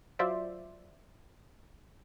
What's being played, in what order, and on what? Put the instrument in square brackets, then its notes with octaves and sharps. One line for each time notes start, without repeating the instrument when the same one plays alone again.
[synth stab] F#3 F4 C5 D5 E5